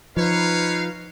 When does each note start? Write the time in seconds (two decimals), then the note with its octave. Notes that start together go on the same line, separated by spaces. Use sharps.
0.17 F3 D#4 B4 C#5 F5